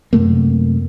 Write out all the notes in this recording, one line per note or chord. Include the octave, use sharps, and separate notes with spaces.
F#2 C3 A3 A#3